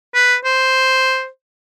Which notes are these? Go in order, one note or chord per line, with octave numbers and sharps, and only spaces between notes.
B4
C5